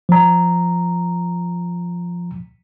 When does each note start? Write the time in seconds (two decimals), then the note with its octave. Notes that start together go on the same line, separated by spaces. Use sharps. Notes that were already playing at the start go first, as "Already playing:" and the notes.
0.09 F3 A#5